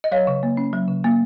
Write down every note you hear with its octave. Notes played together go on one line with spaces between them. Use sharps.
D#5
F#3 C#5 F5
C#3
A#3
C#4
F#3
C#3
A#3